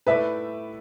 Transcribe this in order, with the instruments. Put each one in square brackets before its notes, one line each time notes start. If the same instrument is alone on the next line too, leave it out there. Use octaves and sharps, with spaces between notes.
[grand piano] A2 A3 E4 D5 [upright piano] B4 E5